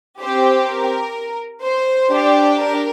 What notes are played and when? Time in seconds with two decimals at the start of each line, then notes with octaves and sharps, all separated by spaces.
0.20 C4 G4 C5
0.68 A#4
1.64 C5
2.10 D4 G4
2.58 A#4